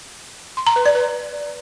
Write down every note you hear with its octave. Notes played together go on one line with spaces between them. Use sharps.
C6
A#5
B4
D5
B4